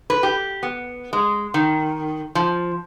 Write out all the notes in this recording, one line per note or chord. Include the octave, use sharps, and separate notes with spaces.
B4
G4
B3
G#3
D#3
F3